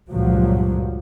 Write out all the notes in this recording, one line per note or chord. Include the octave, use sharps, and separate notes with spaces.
C#2 G2 A#2 F3 F#3